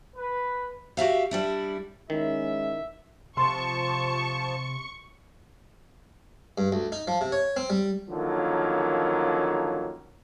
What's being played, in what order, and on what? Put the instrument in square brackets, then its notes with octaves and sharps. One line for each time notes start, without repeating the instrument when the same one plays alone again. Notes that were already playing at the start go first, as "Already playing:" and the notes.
[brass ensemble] B4
[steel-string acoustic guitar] F#4 G4 E5 F5
G3 D4 E4
[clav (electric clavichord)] D#3 [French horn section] G#3 C#4 E4 [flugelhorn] E5
[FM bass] C3 [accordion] F3 A5 [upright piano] C6 [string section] C#6
[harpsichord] G2
D2
D#4
F3
C3
C#5
C4
G3
[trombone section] D3 D#3 F3 F#3 A#3 C#4